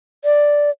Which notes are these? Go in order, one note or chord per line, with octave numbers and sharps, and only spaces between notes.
D5